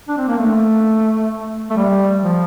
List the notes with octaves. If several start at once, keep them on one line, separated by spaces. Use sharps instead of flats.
D4
C4
A#3
A3
A3
G3
F3